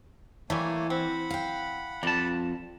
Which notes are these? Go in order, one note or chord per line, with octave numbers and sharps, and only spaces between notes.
E3 G3 A3 A#3 C#5 G#5
C4 F#5 B5
F5 G5
F2 G3 A5